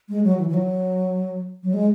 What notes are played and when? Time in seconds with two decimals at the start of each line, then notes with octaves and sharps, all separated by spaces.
0.09 G#3
0.24 F#3
0.38 E3
0.48 E3
0.54 F#3
1.63 F#3
1.74 G#3